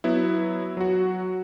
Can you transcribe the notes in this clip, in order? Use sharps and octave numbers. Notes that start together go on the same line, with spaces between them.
F#3 B3 E4
F#3 F#4